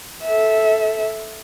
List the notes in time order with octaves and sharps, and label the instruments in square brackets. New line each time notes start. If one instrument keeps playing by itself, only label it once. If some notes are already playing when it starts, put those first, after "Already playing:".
[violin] A4 E5